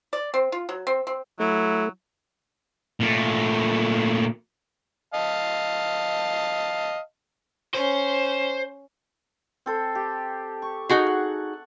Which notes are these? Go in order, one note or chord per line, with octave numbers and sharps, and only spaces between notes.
D5
C4
F4
F#3
C4
C4
F#3 A3 E4
A#2 A3
D#5 F5 A5
C#4 C5
C4 A4 C5
G4
C#6
D#4 F#4 G#4
F#5